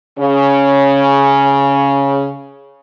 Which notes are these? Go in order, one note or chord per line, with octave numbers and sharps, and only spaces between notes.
C#3 C#4